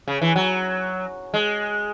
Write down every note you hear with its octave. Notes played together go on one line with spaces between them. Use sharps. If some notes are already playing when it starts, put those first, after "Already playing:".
C#3
E3
F#3
G#3